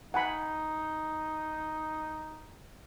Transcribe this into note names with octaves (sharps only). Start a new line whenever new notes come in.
D#4 F#5 G#5 B5